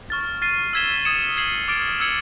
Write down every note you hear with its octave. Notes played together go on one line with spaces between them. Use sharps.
C#6 F6 A6
F6 A6 C7 D#7
E6 G#6 B6 E7 G7
D#6 G#6 C#7 E7
G#6 C7 D#7 F#7
D6 F6 A6 D7
E6 G#6 C#7 F#7